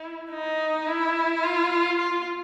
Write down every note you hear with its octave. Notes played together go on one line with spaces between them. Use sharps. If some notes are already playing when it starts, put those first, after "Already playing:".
Already playing: E4
D#4
E4
F4
F4